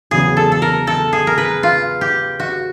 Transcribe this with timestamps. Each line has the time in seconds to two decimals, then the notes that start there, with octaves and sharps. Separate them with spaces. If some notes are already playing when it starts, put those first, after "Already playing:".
0.11 E2 C#3 F#3 B3 G#4
0.37 A4
0.52 A4
0.62 A#4
0.87 A4
1.13 G#4
1.27 A#4
1.38 B4
1.63 F4
2.01 G4
2.40 F#4